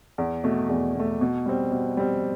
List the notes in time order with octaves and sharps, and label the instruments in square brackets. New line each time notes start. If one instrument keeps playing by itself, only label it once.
[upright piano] E2
B2 A3
E2
B2 A3
B2
G3 C4
B2
G3 C4